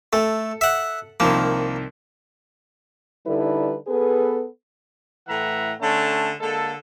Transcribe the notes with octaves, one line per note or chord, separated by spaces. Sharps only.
A3 A4
E5 F#5
C2 D#3 F3 A#3
D3 G3 D#4 E4 A4 B4
B3 G#4 A4 B4
A2 E3 A3 E5 F#5 A#5
D3 A3 C#4 A5
D3 G#3 A#3 A4